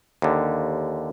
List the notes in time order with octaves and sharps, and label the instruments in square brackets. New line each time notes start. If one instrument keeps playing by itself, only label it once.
[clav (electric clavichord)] D#2 D3